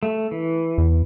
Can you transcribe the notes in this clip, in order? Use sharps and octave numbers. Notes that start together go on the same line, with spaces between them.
A3
E3
E2